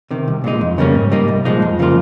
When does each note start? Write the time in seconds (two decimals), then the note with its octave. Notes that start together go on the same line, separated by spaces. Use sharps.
0.11 C3 D#3
0.28 C2
0.44 A#2 G#3 D#4
0.61 F2
0.78 C#3 G3 A#3 C#4
0.95 G#2
1.12 G3 A#3 D#4
1.28 C2
1.45 A#2 F3 G#3 D#4
1.62 F2
1.79 C#3 F3 A#3 F4